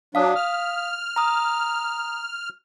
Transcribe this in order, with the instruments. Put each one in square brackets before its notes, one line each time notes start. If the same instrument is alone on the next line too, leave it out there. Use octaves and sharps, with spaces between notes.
[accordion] F#3 D4 [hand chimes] F5 D#6
[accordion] F6
[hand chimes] A#5 D#6